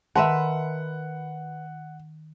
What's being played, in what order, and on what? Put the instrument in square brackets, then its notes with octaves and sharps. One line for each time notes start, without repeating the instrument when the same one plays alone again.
[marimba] D#3 [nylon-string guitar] A#4 B4 E5 [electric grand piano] F#5 [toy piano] A5 C6